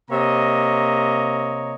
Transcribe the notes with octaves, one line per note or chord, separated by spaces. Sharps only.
C3 A#3 C#5 D#5 A#5